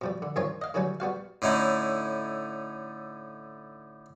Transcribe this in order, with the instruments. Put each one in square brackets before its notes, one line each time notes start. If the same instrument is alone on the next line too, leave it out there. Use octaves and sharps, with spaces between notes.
[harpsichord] B2 F3 G3
D3
G2 D#3 C4 F4 C#5
D#5 F5
D3 E3 F#3 G3 C#4
G3 B3 F#4 F5
A2 D3 C#4 D#4 E4